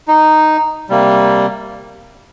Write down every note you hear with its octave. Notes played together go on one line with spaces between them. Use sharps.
D#4
C3 G3 A#3